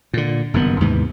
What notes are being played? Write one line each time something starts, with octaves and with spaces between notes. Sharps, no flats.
A#2 D3
F#1 G2 D#3 B3
D#2 G#2 C3 E3